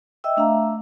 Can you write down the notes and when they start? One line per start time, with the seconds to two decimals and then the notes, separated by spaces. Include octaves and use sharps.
0.24 D#5 E5 G5 E6
0.37 A3 D4 E5 F5 A#5